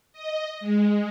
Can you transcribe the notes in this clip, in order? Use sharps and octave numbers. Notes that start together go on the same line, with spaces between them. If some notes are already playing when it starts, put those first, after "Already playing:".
D#5
G#3